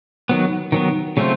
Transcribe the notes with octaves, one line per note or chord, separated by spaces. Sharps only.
D#3 F#3 B3
D#3 F#3 B3
C#3 F#3 A3 C4 F4